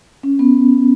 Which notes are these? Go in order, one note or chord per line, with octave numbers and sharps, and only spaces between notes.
C#4
B3